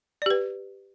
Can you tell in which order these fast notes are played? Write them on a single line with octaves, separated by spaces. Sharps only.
D5 G4 B4